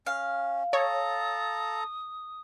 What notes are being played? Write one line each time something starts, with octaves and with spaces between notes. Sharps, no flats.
C#4 F5
A4 C#5 A5 A#5 D#6